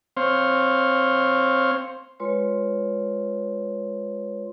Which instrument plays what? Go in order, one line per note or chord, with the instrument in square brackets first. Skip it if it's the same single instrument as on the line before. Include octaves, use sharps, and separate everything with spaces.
[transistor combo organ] C4 C5 C#5 F5
[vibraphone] G#3 F4 B4 C#5 C6